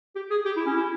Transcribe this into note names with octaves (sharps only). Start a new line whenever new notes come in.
G4
G#4
G4
E4
C#4
E4